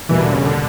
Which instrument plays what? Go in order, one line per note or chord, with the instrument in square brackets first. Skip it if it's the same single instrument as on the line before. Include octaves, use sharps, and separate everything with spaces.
[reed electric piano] E2 B2 G3 A#3 [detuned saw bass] E3
[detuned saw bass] D3
C#3
D3